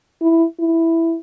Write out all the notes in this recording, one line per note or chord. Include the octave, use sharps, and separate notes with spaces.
E4
E4